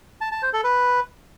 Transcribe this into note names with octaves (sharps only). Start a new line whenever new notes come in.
A5
A5
C5
A4
B4